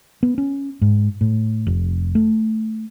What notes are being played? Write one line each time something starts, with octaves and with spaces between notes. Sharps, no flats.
B3
C#4
G#2
A2
F1
A3